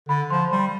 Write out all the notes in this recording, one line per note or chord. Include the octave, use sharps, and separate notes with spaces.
D3 B5
F3 C6
G3 C6